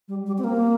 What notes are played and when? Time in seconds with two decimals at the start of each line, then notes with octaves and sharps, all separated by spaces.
0.08 G3
0.27 G3
0.38 C4
0.44 A#3